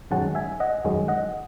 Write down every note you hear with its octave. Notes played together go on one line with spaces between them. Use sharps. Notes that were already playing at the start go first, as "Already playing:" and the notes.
F#2 D#3 G#3 C#4 F#5 A5
E5 G#5
D#5 F#5
F#2 D#3 G#3 C#4
D#5 F#5